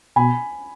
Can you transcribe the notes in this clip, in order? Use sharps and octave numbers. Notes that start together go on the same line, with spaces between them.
B2 G#5 B5